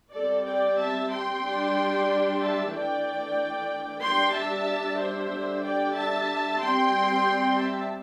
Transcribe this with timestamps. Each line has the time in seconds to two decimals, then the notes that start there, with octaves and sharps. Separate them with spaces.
0.14 G3 C4 A4 D5
0.46 D5 G5
0.78 E5 A5
1.11 G5 C6
1.43 G3 D4
2.40 E5 A5
2.72 E3 A3 D4 D5 G5
4.02 G3 D4 G5 C6
4.33 E5 A5
4.99 C5 E5
5.31 D3 G3 D4
5.63 D5 G5
5.95 E5 A5
6.60 G3 C4 G5 C6
7.57 E5 A5